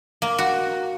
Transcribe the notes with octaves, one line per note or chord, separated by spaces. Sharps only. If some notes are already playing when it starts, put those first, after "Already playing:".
A#3
F#4